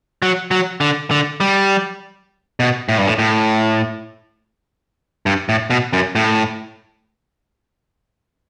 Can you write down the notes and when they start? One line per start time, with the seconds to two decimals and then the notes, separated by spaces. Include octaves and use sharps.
0.22 F#3
0.51 F#3
0.81 D3
1.11 D3
1.40 G3
2.60 B2
2.89 A2
2.98 G2
3.08 A2
3.19 A2
5.26 G2
5.49 A2
5.70 B2
5.93 F#2
6.16 A2